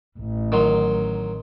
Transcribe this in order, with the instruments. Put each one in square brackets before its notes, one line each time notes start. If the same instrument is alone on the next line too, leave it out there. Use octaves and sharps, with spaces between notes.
[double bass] A1
[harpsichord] D#3 F#3 C6